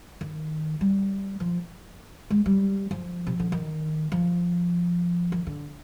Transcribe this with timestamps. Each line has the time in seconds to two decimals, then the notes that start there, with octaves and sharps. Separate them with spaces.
0.21 D#3
0.81 G3
1.40 F3
2.30 G#3
2.46 G3
2.91 F3
3.27 C3
3.40 D3
3.52 D#3
4.12 F3
5.32 D#3
5.47 D3